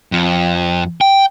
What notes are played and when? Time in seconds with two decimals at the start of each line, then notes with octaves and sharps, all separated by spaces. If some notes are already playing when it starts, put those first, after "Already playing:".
0.12 F2
1.01 G5